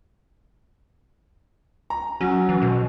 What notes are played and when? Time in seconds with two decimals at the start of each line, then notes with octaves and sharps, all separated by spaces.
1.90 A#5
2.21 F#3 C#4
2.49 E3
2.62 B2